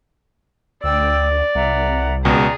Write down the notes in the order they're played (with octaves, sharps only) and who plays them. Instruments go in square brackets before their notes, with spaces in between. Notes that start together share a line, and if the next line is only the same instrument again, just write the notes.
[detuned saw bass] D2 [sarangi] D5 [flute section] G5 E6
[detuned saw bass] C2 [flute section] E5 F#5 A#5
[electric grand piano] C#2 B2 [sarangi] G#4 [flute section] D5 A#5